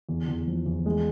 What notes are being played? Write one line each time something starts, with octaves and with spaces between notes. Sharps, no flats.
E2
E2
F3
E2
G#3